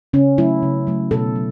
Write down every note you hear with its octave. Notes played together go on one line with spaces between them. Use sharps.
C#3 C#4
F#3 A3 E4
C#3
F#3 A3
B2 A4
F#3